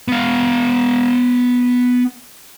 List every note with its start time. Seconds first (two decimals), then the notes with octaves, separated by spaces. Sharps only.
0.08 B3 F5